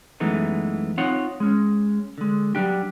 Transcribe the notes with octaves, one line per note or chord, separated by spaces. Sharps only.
F#2 E3 G#3 A3 B3 D#4
C4 D#4 F4 C#5 F#5
G#3 C#4
D3 G#3
F#3 G3 D4 G4